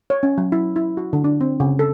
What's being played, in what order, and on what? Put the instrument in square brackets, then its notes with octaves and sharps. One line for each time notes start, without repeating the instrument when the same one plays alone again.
[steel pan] C#5
C#4
F#3
E4
E4
F#4
D3
D4
C4
C#3
A4